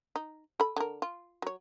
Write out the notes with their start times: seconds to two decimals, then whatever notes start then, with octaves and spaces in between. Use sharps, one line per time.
0.16 D#4
0.60 A4 B5
0.76 D3 A#4
1.02 F4
1.42 F#3 C#5